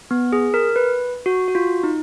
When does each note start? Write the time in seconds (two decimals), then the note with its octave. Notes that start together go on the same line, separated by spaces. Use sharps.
0.11 B3
0.33 G#4
0.54 A#4
0.76 B4
1.26 F#4
1.48 F#4
1.55 F4
1.83 D#4